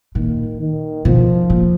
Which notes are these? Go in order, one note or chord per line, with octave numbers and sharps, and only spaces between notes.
A#2 D#3
D#3
B2 F3
A#2